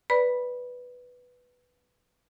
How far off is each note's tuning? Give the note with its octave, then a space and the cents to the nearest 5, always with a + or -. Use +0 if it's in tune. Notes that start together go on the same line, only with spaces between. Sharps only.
B4 +0 D5 +0 B5 -15